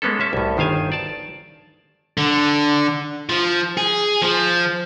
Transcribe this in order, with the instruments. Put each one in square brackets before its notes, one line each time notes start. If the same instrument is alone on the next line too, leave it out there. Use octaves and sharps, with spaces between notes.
[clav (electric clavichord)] G#3 A#3 B3 C#4 A4
C#4 E5 A5
C2 A2
G1 D#3 C5 F5 G#5
D5 A5
[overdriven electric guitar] D3
F3
G#4
F3